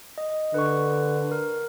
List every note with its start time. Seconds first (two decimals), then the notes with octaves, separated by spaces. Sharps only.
0.18 D#5
0.54 D3 B4 C#6
1.32 A#4